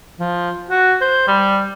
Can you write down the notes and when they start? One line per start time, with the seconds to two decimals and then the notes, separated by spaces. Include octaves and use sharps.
0.19 F3
0.70 F#4
1.01 C5
1.27 G3